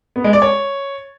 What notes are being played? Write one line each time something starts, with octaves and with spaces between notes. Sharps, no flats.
B3
G#3
D5
C#5